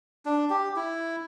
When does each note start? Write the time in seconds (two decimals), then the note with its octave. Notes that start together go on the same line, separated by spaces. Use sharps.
0.26 D4
0.50 G4
0.76 E4